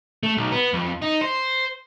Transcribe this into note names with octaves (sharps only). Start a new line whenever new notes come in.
A3
B1
B3
F2
D#4
C5